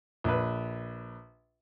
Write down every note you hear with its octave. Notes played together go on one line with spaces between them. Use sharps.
A#1 B4